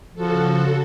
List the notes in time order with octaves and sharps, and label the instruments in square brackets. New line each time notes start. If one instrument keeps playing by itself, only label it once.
[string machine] C#3 F#4 A4 [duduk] F3